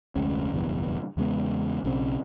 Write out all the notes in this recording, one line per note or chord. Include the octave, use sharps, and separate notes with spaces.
F1 D2 G#3 C#4
F#1 B1 E2 G2
E2 C#3 G#3 B3
B1 C#3 C4